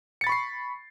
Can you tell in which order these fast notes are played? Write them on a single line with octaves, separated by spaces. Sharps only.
C#7 A6 B5 C#6 C7